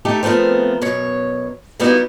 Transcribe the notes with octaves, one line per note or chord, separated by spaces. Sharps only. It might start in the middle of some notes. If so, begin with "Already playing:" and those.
A3 D#4 G4 A4
F3 A3 B3 C4 A#4
F#2 B2 C#5
G3 A#3 B3 D#4 E4 F#4